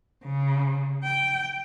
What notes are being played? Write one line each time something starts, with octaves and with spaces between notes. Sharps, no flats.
C#3
G5